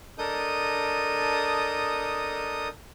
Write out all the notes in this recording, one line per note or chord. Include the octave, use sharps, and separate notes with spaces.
D4 A4 A#4 D#5 D#6 G6